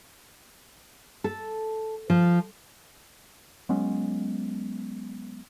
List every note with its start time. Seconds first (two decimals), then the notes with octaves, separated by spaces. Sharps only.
1.24 A4
2.10 F3
3.69 F#3 G#3 B3 C#4